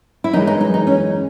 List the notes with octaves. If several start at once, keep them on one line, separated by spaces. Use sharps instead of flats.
E4
F#2 E3 G#3 D#4
D#4
D#4
D#4
C#4